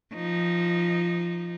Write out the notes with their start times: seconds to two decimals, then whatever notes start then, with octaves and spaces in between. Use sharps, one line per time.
0.14 F3 D#4